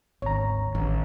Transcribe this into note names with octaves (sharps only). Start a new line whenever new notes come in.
G#1 D2 C#5 A#5
A1 D#3